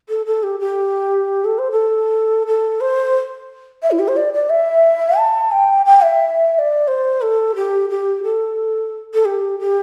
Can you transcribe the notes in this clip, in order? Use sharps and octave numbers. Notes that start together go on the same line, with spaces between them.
A4
A4
G4
G4
A4
C5
A4
A4
C5
E5
E4
G4
C5
D5
D5
E5
A5
G5
G5
E5
E5
D5
C5
A4
G4
G4
A4
A4
G4
G4